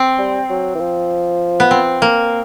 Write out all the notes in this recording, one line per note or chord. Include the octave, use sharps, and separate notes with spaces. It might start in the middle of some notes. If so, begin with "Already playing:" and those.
Already playing: C4
G3
F#3
E3
F3
B3
C4
A#3